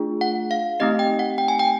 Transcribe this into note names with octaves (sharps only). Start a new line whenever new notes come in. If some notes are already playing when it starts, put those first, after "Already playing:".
Already playing: A3 D4 F4 G#4
F#5
F5
A3 C4 D#4 G4 D#5
G5
F#5
G5
G#5
G5